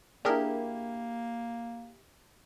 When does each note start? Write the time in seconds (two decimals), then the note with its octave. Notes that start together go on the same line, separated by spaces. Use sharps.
0.25 A#3 D4 E4 G4 G#4 A#4